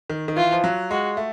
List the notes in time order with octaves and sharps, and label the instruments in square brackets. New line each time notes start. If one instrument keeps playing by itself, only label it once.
[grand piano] D#3
D#3
[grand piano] E3 [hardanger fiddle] F4
[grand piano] F3
F#3
[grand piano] G#3 [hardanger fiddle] F#4
[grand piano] A3